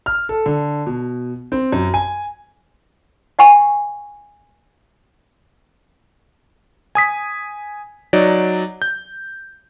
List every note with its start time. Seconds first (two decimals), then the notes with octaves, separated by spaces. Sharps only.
0.06 F6
0.29 A4
0.46 D3
0.87 B2
1.52 C4
1.72 F#2
1.94 G#5
3.39 D#5 F#5 G#5 C#6
6.95 G#5 D#6 B6
8.13 F#3 D#4 D5
8.82 G6